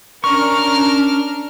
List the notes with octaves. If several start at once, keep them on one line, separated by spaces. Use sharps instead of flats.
C#4 D4 A#4 C#6 F6